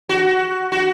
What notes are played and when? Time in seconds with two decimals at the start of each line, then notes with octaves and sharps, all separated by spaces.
0.09 F#4
0.72 F#4